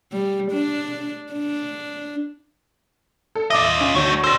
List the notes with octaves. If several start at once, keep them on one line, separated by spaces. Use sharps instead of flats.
G3
D4
D4
A4
F4 D#5 E5 D6
C#4
D2 A3 D#4 C#5
G3 C5 E6 A#6